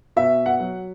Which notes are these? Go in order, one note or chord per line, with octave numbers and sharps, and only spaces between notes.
B2 E5
F#5
F#3